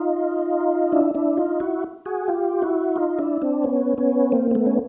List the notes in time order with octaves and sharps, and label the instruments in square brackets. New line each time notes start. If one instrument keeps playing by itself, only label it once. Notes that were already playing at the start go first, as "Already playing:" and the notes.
Already playing: [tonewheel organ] D#4 F4
D4 E4
D4 E4
D#4 F4
E4 F#4
F#4 G#4
F4 G4
E4 F#4
D#4 F4
D4 E4
C4 D4
B3 C#4
B3 C#4
A#3 C4
C4
A3 B3
C#4